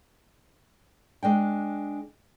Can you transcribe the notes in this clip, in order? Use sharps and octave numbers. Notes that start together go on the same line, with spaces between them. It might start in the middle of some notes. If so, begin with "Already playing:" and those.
G#3 D4 G5